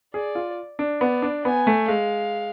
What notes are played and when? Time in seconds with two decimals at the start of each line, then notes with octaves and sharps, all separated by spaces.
0.14 G#4 D5
0.35 F4
0.79 D4
1.01 B3 D5
1.22 D4
1.45 B3 G#5
1.67 A3
1.88 G#3 F5